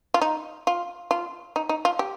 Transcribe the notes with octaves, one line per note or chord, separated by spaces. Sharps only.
F4
D#4
F4
F4
D#4
D#4
F4
G4